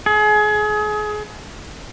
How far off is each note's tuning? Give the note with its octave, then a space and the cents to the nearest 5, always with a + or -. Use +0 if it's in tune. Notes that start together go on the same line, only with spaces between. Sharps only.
G#4 +30